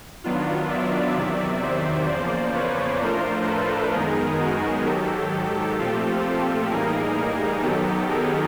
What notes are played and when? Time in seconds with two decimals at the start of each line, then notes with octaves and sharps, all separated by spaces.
0.24 D#3 F#3 B3 D4 F4
0.70 D5 E5
1.16 E2 C3 D#3 F#3
1.63 C5 D5
2.09 E2 C#3 F3 A#3 C5 D5
2.55 B4 C#5
3.01 A2 F3 A3 D4 F4 A#4 C5
3.48 A4 B4
3.94 F#2 D#3 G#3 B3 D#4 G#4 A#4
4.40 F#4 G#4
4.86 G#2 D#3 F#3 G4 A4
5.79 A#2 F3 A3 C4 F4 G4 A4
6.71 A2 E3 G3 A#3 D#4 G#4 A#4
7.63 F#2 D#3 F#3 B3 D#4 G4 A4
8.10 G#4 A#4